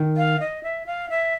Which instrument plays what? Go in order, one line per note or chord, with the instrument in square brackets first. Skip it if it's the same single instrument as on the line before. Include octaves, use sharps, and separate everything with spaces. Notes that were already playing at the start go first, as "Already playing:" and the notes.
Already playing: [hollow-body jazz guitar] D#3
[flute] F5
D#5
E5
F5
E5